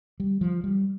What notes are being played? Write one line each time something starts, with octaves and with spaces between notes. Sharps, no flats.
G3
F3
G3